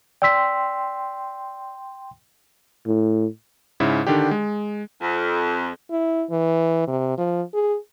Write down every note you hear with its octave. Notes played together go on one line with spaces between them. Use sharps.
D5 G5 C6 E6 B6
A2
G#2 C#3 E4
D3 D#3 D4 G4
G#3
F2
E4
E3
C3
F3
G#4